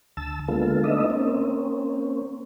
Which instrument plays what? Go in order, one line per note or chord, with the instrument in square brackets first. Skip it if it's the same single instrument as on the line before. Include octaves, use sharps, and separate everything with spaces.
[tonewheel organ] D2 A5 E6
D3 G#3 A#3 B3 F4 A4
A3 B3 D4 D#4 D#5 E5
A#3 C4 C#4